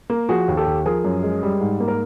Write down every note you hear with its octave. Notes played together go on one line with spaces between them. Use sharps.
A#3
F3 F#4 G#4
D#2
G4 A4
D#2
F3 G#4 A#4
F#2
G#3
G3
G#2
A#3
A#4